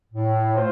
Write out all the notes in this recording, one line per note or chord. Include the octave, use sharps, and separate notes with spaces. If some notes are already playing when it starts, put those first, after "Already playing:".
A2
A3 F4 C5